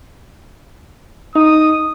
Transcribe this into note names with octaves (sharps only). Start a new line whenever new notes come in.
D#4 D#6